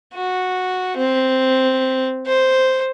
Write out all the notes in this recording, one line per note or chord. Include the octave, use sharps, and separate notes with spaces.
F#4
C4
C5